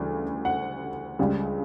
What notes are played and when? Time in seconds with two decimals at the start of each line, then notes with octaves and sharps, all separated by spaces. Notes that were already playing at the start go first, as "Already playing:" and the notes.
Already playing: D2 C#3 E3 G3
0.45 F#5
1.19 C#2 C#3 G3